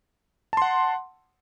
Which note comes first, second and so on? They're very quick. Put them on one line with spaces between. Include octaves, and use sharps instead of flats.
A5 C6 F#5